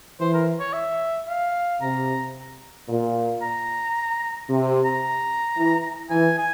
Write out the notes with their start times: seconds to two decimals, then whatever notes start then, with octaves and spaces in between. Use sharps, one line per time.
0.20 E3 C5
0.34 A#4
0.60 C#5
0.73 E5
1.28 F5
1.81 C3 A#5
2.89 A#2
3.42 A#5
4.49 C3
4.85 A#5
5.57 E3
6.10 E3 G#5
6.38 G#5